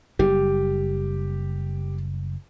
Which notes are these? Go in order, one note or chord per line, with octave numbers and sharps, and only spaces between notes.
F#1 G3 G4